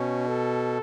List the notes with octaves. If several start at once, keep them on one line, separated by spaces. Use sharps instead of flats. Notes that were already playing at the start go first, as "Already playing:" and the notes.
Already playing: B2 C#4
A4